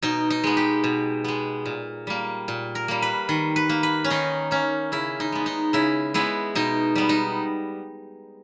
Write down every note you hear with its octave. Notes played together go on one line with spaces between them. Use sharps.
B2 D#4
D#4
G#3 B3
G4
B2
G#3 B3
A#2
G3 A#3
A#2
A#4
G3 A#3
B4
D#3
B4
A#3
B4
C#4
D#3 D#4
A#3 C#4
C#3 E4
D#4
G#3 B3
D#4
C#3 E4
G#3 B3 E4
B2 D#4
G3 B3
D#4